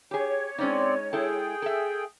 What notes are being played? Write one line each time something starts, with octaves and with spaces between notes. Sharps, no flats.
G4 G#4 C#5
G#3 C4 C#4 D#4 D5
G#3 E4 G#4 A4 G5
A4 E5